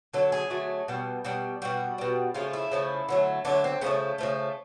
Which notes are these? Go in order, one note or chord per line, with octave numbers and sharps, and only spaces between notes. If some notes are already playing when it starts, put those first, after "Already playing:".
D3 F#3 A3 A4
G#4
D3 F#3 A3
B2 G3
B2 G3
B2 G3 F#4
B2 G3
C#3 F3 A3 F4
E4
C#3 F3 A3
D3 F#3 A3
D3 F#3 A3 D4
C4
C#3 F3 A3 C#4
C#3 F3 A3